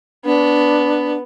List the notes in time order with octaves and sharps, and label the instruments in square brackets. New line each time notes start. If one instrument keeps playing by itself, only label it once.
[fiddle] B3 [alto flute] D4